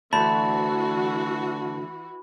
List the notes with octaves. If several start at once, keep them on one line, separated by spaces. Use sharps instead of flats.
D2 E3 F#4 A5 B5